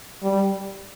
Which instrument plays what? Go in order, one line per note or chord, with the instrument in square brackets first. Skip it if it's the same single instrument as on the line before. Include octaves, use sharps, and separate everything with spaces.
[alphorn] G3